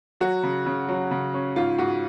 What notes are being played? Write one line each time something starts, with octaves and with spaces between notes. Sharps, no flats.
F#3 F#4
C#3
C#3
F#3
C#3
C#4
G#2 F4
G#2 F#4